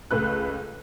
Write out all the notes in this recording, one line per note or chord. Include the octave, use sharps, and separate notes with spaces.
C#2 C#3 A3 B4 F#6